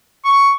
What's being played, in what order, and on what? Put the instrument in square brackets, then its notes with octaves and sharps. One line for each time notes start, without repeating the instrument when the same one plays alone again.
[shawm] C#6